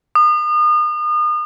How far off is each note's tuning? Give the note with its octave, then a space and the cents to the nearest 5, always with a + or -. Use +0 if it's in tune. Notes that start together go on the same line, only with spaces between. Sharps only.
D#6 -35